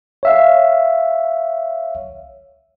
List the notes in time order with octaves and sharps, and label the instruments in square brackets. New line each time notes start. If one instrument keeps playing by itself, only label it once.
[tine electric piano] C#5 E5 F5